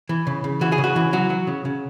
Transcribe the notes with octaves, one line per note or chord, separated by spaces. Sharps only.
E3
C#3
C#3
E3 F#4
G#4
C#3
F#4
E3
F#3 F#4
F#3
C#3
C#3